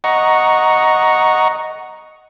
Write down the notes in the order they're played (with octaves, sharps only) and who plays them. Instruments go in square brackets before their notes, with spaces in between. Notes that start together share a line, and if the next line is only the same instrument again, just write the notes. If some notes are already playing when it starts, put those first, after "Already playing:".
[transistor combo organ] D#5 F#5 A#5 C#6